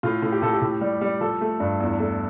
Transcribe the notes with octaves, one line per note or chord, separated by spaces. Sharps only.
A2 F4
A2
G4
A2 A4
G4
A2
G3
G3
F3 A4
A3
G2
E2
A3